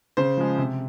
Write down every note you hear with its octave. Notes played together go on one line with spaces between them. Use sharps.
C#3 C5
F3 G#3
C3